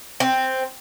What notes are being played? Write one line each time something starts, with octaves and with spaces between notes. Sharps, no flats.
C4